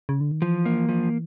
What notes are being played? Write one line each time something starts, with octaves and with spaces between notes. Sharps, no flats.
C#3
D3
D#3
E3 F3
A#3
F3